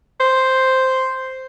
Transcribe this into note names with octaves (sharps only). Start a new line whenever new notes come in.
C5